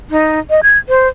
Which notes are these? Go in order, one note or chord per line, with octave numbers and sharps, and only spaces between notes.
D#4
D#5
G#6
C5